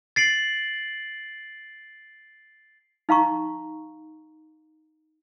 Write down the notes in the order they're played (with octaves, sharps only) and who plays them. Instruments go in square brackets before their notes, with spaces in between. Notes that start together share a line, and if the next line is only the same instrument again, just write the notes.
[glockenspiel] A6 C7 D7 F#7
[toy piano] D#4 F5 A#5 C#6